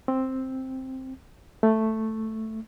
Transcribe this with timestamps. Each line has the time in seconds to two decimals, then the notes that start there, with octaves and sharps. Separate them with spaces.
0.08 C4
1.63 A3